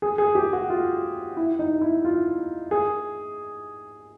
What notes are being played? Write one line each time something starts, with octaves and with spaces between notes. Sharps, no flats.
G#4
G#4
G4
F#4
F4
E4
D#4
E4
F4
G#4